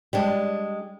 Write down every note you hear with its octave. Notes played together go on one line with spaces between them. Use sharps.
G3 G#3 D4